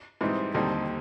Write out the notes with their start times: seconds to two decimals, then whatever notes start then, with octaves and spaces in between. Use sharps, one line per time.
0.21 G#2 E3 G3 C4 D#4
0.54 D#2 D3 G3 C4 D#4